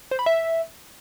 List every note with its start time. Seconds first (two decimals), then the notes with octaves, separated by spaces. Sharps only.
0.11 C5
0.19 B5
0.26 E5